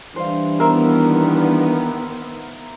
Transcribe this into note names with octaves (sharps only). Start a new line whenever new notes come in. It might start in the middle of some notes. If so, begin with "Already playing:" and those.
E3 G3 D4 C5 F5
D#3 B3 A#4 C5 E5